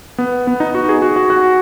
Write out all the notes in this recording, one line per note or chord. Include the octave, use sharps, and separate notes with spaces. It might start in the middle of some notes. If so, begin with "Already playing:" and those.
B3
B3
D#4
F#4
G#4
F#4
F#4
F#4